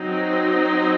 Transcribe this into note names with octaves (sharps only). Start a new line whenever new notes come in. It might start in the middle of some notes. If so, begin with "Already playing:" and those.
Already playing: F#3 C4 D#4